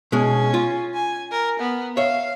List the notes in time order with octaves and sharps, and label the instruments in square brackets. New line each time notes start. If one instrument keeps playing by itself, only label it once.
[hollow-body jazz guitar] B2 G#3 [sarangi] C#4
[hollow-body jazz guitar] F4
[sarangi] G#5
A#4
B3
[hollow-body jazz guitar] C#5 E5 [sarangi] F5